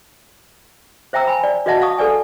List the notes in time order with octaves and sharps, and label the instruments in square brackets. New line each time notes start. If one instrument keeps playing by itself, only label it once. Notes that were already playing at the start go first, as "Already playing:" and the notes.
[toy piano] C5 E5 G5 A#5 E6
G#5 B5
D5
F#4 B4 D#5 E5 F#5 A5
F5 A5 C#6 D#6
A4 B4 D5 G#5